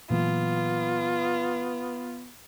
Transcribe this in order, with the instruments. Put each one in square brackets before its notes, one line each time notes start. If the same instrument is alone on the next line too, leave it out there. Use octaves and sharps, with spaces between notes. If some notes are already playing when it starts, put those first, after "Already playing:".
[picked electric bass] A#2 E3 F#3 [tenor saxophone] B3 [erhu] F4